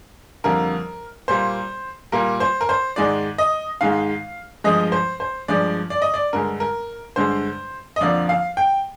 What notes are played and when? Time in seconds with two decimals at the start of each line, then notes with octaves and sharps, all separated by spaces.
0.44 F2 D3 G3 A#3 A#4
1.28 A#2 G3 A#3 C5
2.12 A#2 G3 A#3 A#4
2.40 C5
2.61 A#4
2.69 C5
2.96 G#2 D#3 G#3 D5
3.38 D#5
3.81 G#2 D#3 G#3 F5
4.64 G2 F3 G#3 D#5
4.92 C5
5.20 C5
5.48 G2 F3 G#3 D5
5.90 D5
6.02 D#5
6.14 D5
6.33 G2 D3 G#3 A#4
6.60 A#4
7.16 G2 D3 G#3 C5
7.96 D#5
8.01 F2 D3 F3 A#3 D5
8.29 F5
8.57 G5